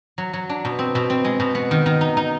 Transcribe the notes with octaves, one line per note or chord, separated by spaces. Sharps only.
F#3
F#3
D4
B2
C4
B2
C4
G#3
B2
B3
D#3
D#3
D#4
D#4